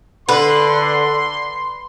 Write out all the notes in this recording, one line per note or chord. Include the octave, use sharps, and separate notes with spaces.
D3 B4 C6